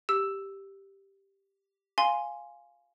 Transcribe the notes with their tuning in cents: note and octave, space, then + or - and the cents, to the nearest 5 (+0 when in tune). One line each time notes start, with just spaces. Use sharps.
G4 +0 E6 +0
F5 +0 G#5 +0 C6 +0